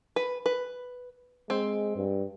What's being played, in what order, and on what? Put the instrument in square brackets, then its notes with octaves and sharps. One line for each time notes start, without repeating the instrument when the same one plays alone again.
[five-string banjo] B4
B4
[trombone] G#3 [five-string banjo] C4
[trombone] G2